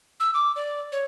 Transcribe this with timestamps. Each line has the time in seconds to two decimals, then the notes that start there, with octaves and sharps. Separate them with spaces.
0.20 E6
0.34 D6
0.56 D5
0.92 C#5